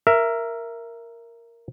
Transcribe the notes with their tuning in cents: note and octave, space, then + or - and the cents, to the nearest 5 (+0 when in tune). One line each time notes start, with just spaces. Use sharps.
A#4 +0 E5 +15